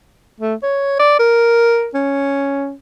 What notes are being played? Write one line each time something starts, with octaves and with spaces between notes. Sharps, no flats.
A3
C#5
D5
A#4
C#4